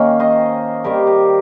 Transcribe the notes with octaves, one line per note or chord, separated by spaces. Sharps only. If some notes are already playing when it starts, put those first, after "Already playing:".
Already playing: D#3 A#3 C#4 F5 G5
C5 D#5
D#3 G3 C4 G4 A#4
G4